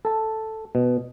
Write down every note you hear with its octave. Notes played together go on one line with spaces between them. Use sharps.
A4 A5
B2